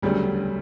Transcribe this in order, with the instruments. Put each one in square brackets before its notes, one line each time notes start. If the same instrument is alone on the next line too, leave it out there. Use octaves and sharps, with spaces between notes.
[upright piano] E1 D2 C#3 F#3 A3 [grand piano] G3